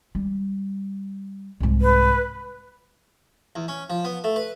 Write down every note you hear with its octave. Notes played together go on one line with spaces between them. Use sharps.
G3
C2 G#2
B4
E2
C#4
F3
B3
A3
B4